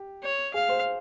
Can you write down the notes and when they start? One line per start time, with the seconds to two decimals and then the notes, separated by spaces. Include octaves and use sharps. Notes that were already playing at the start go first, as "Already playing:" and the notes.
Already playing: G4
0.23 C#5
0.54 G#4 F5
0.69 C5